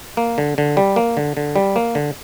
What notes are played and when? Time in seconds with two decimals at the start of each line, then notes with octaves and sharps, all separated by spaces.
0.17 A#3
0.38 D3
0.58 D3
0.77 G3
0.96 A#3
1.17 D3
1.37 D3
1.56 G3
1.76 A#3
1.95 D3